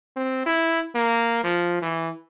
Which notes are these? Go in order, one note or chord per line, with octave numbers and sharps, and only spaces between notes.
C4
E4
A#3
F3
E3